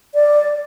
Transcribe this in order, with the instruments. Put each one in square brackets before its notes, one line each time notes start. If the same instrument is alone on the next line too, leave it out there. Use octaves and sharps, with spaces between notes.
[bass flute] D5